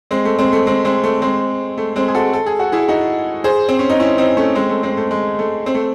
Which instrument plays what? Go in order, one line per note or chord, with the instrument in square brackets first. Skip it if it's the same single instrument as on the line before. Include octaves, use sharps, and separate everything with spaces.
[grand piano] G#3 C4
A3
G#3 C4
A3
G#3 C4
G#3 C4
A3
G#3 C4
A3
G#3 C4
G#4
F#4 A4
A4
G#4
F#4
E4 G#4
D#4 F#4
G#4 C5
C4
C#4
D#4
C#4 E4
C4 D#4
A3 C#4
G#3 C4
A3
G#3 C4
A3
G#3
A3
C4
A3